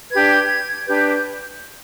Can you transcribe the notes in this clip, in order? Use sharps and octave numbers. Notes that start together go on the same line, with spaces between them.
D4 G4 B4 G#6
D4 G4 B4 G6